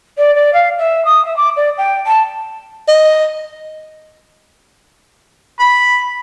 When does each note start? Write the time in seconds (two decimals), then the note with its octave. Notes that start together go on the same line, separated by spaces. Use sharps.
0.18 D5
0.35 D5
0.53 F5
0.78 E5
1.05 D#6
1.25 E5
1.37 D6
1.57 D5
1.78 G5
2.06 A5
2.88 D#5
5.59 B5